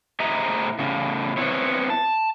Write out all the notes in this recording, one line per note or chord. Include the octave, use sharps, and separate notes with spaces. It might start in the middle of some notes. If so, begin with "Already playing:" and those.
A2 G#4 C5 D#5 E5 A#5
A2 C#3
B3 C4 E4 C#5
A5